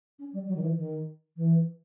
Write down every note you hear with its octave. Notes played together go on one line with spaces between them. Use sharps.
C#4
G3
F#3
D#3
E3
D#3
E3